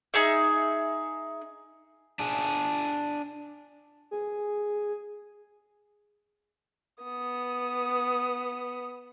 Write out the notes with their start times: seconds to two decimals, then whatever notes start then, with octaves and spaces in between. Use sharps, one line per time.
0.14 D#4 G#4 E5
2.19 D4 G#4
4.11 G#4
7.03 B3 D#6